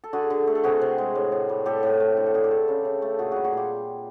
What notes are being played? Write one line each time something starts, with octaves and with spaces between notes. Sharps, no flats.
A4
D3 F#4 G#4
D3
A3
A4
C3 F#4 G#4
C3
G#3
A2
A2
G3
A2 G4 A4
A2
A3
D3
A4
D3 G#4
G4 A4
A3
C#3
C#3
A3
A#2 F#4 G#4
G3 F#4 G#4
F#4 G#4
A#2 F4 G4